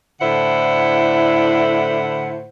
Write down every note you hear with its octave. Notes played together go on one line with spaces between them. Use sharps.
A2 D3 E4 C5 F#5